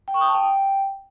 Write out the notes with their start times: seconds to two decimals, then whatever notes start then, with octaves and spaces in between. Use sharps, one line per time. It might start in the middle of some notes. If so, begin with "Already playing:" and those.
0.08 G5
0.14 C#6
0.21 D#6
0.27 A5
0.34 G5